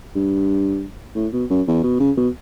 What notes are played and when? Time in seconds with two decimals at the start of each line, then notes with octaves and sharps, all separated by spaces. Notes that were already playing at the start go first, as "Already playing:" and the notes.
0.15 G2
1.15 A2
1.33 B2
1.50 F#2
1.67 E2
1.83 B2
2.00 C#3
2.17 B2